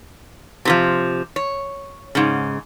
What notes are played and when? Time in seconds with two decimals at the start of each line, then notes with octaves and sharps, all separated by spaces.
0.65 C3 E3 F3
1.36 C#5
2.15 G#2 C#3